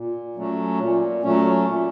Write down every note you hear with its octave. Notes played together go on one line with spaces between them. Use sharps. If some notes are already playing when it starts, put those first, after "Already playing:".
Already playing: A#2
F#3 A3 C#4
A#2
F#3 A3 C#4
A#2